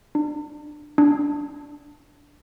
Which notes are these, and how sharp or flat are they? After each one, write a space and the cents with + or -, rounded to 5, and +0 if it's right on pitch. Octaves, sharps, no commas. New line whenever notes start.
D4 +25
D4 -5